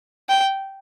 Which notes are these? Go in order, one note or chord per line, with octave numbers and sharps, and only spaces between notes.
G5